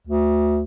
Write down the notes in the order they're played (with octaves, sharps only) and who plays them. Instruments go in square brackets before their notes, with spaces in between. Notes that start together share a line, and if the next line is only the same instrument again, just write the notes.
[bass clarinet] D2